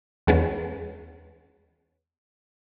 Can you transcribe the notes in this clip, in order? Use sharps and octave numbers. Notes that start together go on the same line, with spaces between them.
E2 G#3 B3 C#4